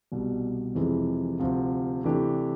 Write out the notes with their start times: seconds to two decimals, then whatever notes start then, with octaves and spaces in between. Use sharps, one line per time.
0.12 C2 B2 G3
0.75 F2 C3 E3 G#3
1.40 D2 C3 F3
2.04 C3 E3 A3 D4 G4